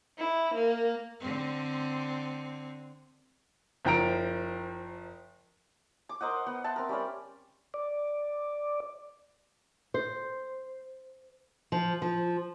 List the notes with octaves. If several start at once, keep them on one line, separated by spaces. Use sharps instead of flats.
E4
A#3
D3 C4
F#1 F3 G5 A#5 D7
D6
A#4 C5 D#5 F#5
B3 F#5
E5 G5 A5 C6
C4 A#4
G3 C#4 D5
D5
C5
F3
F3